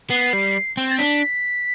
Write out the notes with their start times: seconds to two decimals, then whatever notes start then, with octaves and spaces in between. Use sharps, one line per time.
0.10 B3 C7
0.33 G3
0.77 C4
0.91 A6
0.98 D4 B6